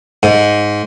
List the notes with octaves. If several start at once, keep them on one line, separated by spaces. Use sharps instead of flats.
G#2